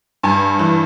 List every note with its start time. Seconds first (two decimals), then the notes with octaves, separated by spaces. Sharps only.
0.23 G2 G#5
0.59 E3